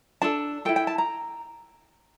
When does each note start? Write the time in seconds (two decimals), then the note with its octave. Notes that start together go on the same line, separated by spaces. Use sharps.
0.22 D4 A4 A5
0.65 A4 G5
0.69 E4
0.76 G5
0.87 A5
0.98 A#5